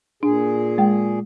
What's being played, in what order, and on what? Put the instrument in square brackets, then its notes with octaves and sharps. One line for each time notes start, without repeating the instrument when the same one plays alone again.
[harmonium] A#2 G#4 [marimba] D4
[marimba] G#3 G5